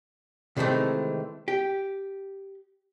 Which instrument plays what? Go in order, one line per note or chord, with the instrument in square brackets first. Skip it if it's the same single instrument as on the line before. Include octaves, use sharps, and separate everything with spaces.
[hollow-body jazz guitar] C3 D#3 E3 G#3 A3 C4
G4